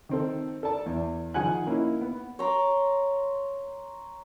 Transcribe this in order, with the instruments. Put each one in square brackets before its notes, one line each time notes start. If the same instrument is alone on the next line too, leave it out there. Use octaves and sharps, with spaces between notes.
[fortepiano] D#3 C4 A4
A4 D5 A5
E2
D#3 F3 G#4 F#5 G#5 F#6
A#3 C#4 D#4 E4
B3
[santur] C#5 A#5 C6 D6